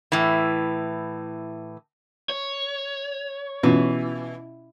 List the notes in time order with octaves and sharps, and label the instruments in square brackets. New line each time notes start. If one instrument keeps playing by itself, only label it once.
[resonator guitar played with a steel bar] A2 E3
[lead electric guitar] C#5
[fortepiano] B2 [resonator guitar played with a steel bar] E3 [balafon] C#4 F4